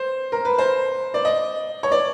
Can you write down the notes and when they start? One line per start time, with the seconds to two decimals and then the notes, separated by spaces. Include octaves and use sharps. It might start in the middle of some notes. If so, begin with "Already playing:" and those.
Already playing: C5
0.32 A#4
0.45 B4
0.58 C5
1.14 D5
1.25 D#5
1.83 C#5
1.92 D5